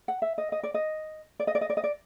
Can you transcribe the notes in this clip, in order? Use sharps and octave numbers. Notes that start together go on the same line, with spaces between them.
F#5
E5
D#5
D#5
D5
D#5
D5
D#5
D5
D#5
D5
D#5
D5